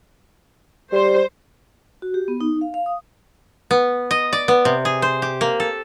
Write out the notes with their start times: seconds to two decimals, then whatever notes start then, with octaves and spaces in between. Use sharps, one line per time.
0.92 G3 C5
2.02 F#4
2.14 G4
2.28 B3
2.41 D#4
2.61 F5
2.74 F5
2.86 D#6
3.71 B3
4.11 D#5
4.33 D5
4.48 B3
4.65 C3
4.85 G#4
5.02 C5
5.22 G4
5.41 A#3
5.60 A4